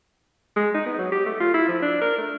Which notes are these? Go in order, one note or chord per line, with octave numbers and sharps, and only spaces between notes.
G#3
D#4
B3
F#3
G4
A3
F4
E4
F3
D4
A#4
A3